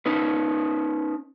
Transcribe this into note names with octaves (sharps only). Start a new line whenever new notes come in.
C#4 D#4 B4